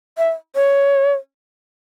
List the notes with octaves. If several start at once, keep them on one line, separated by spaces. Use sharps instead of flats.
E5
C#5